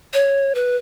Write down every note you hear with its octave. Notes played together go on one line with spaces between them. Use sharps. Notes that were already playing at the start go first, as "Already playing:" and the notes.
C#5
B4